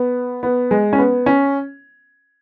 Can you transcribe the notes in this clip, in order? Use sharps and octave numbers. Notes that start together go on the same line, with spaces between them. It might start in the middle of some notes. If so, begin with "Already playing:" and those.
Already playing: B3
B3
G#3
C#4
B3
C#4